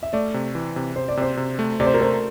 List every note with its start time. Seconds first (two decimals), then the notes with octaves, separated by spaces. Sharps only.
0.03 E5
0.13 A3 D5
0.34 C3
0.55 E3
0.76 C3
0.96 C3 C5
1.08 D5
1.17 C3 C5
1.37 C3
1.59 A3
1.80 C3 D5
1.86 C5
1.94 A#4
2.00 A3 C5